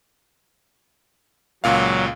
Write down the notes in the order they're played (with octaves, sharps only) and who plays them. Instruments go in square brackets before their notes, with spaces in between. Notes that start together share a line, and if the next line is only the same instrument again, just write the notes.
[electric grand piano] C#2 A#2 F5 [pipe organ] F#3